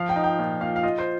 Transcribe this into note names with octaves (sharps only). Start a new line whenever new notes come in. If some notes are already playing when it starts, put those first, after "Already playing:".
Already playing: F3 F5
G5
D#4
G5
A#2
A#2 F5
F5
F4 D#5
C5